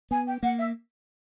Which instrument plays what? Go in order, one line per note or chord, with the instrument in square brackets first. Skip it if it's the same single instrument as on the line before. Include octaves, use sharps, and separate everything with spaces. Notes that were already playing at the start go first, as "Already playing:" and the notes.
[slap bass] B3 [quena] G#5
[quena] G5
[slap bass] A#3 [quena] F#5
[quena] E5